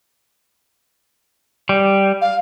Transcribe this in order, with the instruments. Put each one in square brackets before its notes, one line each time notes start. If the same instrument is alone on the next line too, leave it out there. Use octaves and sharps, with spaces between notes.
[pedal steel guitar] G3
[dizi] F5